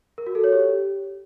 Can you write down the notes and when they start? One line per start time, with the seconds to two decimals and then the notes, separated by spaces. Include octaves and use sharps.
0.18 A#4
0.27 F#4
0.35 A4
0.44 C#5
0.52 G4